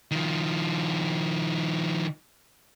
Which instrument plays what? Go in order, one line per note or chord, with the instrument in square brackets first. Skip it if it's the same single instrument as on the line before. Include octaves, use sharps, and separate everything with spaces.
[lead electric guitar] D#3 F3